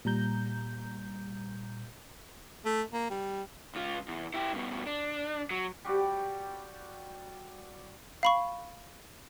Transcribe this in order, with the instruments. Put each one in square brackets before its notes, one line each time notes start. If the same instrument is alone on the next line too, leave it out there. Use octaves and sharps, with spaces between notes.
[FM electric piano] A#2 G3 A#5 G6
[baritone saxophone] A3
A#3
G3
[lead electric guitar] C#2 F4
E2
E4 G4
G2 B2
D4
F#3
[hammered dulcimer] G3 F#4 G4 D5
[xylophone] F5 B5 C#6